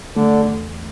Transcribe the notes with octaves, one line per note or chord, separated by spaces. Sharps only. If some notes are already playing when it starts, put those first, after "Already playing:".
D3 A3
E2